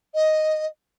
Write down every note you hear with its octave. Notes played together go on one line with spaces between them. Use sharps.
D#5